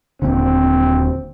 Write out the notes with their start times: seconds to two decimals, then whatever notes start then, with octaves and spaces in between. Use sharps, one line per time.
0.22 D#1 A#2 D3 C4